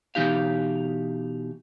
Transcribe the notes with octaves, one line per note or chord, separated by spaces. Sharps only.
B2 E3 D#4 G4 F5